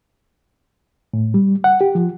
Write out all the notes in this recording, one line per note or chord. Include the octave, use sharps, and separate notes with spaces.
A2
G3
F#5
G4
F3